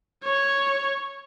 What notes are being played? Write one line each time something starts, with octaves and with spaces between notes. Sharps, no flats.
C#5